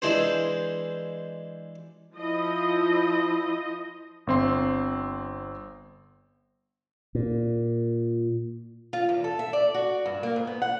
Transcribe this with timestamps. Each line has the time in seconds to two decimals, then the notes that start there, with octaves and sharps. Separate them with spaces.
0.02 E3 G#3 D4 C5
2.15 F3 E4 D#5
4.27 G1 C4 C6
7.15 A#2
8.93 F4
9.09 E2
9.24 A4
9.39 E5
9.53 D5
9.74 F#4
10.06 G2
10.23 A#3
10.36 G#2
10.47 B3
10.62 F#5